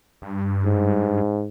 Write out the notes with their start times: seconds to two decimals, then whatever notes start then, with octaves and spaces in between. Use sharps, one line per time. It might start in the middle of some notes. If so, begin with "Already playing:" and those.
0.22 G2
0.65 G#2